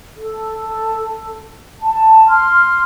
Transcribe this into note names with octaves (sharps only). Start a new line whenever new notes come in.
A4
A5
C6 F6